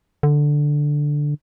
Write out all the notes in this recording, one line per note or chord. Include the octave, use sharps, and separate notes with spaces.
D3